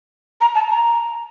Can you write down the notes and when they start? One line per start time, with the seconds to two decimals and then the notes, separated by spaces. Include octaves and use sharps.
0.41 A#5
0.55 A5
0.70 A#5